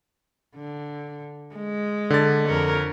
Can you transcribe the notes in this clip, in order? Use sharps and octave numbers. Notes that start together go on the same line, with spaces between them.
D3
G#3
D3 A6
F2 A#4 C#5